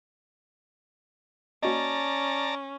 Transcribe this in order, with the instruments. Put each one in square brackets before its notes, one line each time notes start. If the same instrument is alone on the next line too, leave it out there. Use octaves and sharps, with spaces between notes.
[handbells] A#3 F#4 D#5 [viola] C#4 [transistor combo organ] D5 A5 A#5